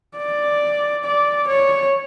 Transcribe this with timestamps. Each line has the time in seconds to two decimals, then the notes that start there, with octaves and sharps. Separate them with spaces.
0.17 D5
1.04 D5
1.47 C#5